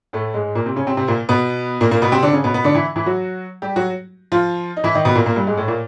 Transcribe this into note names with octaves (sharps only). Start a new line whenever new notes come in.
A2 A3
G#2 G#3
A#2 A#3
C3 C4
C#3 C#4
C3 C4
C3 C4
A#2 A#3
B2 B3
A#2 A#3
A#2 A#3
B2 B3
C3 C4
D3 D4
C#3 C#4
B2 B3
B2 B3
D3 D4
E3 E4
E3 E4
F#3 F#4
G3 G4
F#3 F#4
F3 F4
D#4
E3 E4
D#3 D#4
B2 B3
A#2 A#3
A#2 A#3
G2 G3
G#2 G#3
A2 A3
A#2 A#3